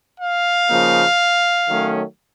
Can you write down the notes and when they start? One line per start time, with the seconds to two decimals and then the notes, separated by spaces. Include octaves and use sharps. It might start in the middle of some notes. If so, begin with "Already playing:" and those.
0.19 F5
0.69 C#3 F3 A#3 D#4
1.67 D#3 F#3 A3 C#4